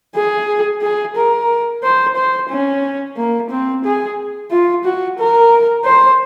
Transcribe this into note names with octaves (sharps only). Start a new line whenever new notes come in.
G#4
G#4
A#4
C5
C5
C#4
A#3
C4
G#4
F4
F#4
A#4
C5